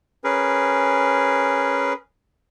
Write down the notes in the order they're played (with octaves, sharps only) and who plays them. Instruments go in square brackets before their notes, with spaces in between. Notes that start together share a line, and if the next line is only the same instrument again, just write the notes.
[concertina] C#4 G#4 A#4 B4